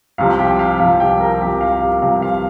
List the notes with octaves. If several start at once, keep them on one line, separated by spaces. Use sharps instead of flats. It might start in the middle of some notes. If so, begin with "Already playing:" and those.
C2 C3 F3 F5
G4 G5
F5
C2 C3 F3 F5
G4 G5
A#4 A#5
C2 C3 F3 G4 G5
F5
G4 G5
C2 C3 F3 F5
F5